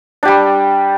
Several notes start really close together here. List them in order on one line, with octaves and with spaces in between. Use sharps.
D4 G4 G3